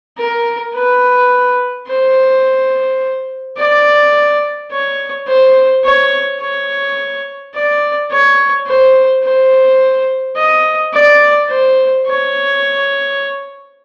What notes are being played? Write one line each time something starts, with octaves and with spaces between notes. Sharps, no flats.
A#4
B4
C5
D5
C#5
C5
C#5
C#5
D5
C#5
C5
C5
D#5
D5
C5
C#5